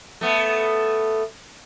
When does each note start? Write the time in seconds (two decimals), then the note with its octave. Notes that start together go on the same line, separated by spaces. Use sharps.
0.21 A3 B3